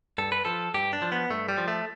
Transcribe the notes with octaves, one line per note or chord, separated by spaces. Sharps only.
G2 A4
B4
F3 A4
G2 G4
D4
F3
B3
G2 A3
G3
F3
A3